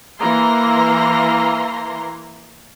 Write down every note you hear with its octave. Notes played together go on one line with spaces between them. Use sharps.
E3 A#3 A#5 C6